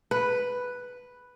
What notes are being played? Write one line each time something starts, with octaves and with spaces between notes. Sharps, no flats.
B4